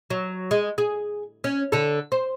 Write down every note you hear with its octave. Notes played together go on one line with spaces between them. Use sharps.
F#3
G#3
G#4
C#4
D3 A4
C5